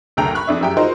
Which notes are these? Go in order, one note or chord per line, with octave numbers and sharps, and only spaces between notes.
F#1 D2 A4 G5 A#5 F7
B5 C#6 F#6
F2 D4 E5
F#2 E4 G4 G#4 G5
D#4 F4 F#4 A#4 C5 D#5